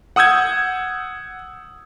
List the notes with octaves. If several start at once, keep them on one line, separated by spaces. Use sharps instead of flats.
F#5 D#6 E6 G6 G#6